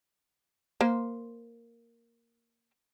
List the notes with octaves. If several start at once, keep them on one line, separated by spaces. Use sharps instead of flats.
A#3 C5